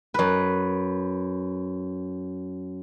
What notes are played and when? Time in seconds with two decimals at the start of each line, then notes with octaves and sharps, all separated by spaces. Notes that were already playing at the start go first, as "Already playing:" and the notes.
0.14 F#2 B4